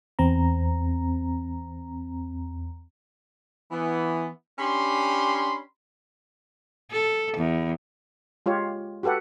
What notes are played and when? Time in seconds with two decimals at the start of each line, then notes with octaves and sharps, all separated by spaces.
0.19 E2 C4 A#5
3.72 E3 B3
4.59 C#4 D4 G4 B5 C6
6.91 A4
7.37 E2
8.46 G#3 F4 G4 C#5
9.03 F#4 G4 A4 B4 F#5